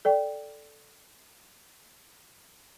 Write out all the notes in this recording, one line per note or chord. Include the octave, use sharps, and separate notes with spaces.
A4 D5 G5